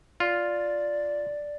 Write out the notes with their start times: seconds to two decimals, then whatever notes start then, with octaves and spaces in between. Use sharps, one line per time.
0.20 F4 D5